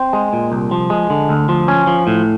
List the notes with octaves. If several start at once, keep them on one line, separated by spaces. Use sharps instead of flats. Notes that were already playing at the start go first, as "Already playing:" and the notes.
Already playing: C4
G#3
A#2
C2
F3
G#3
D3
D2
F3
C#4
F3
A2